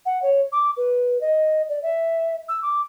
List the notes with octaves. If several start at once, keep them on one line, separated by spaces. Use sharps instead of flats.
F#5
C#5
D6
B4
D#5
D5
E5
E6
D6